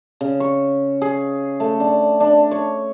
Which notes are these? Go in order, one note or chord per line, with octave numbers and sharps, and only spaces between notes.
C#3
C#6
G#4
A3
D4
D4
C#5